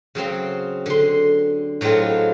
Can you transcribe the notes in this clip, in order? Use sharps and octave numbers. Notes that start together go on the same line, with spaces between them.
C#3 F#3 C4 C6
D3 C6
A2 F#3 G#3 B3 C4 F4